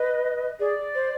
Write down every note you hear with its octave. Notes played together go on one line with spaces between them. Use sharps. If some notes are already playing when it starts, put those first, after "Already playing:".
Already playing: B4 D#5
G#4 D5
C5